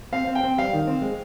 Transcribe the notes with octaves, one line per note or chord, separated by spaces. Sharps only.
C4 F5
C4
G5
C4
G3 F5
D#3
C4
G#3